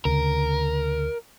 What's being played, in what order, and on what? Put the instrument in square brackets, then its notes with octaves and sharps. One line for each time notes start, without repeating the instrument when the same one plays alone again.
[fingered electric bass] D2 C#3 [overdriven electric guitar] A#4